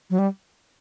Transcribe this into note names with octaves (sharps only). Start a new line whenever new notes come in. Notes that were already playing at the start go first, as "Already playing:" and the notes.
F#3
G3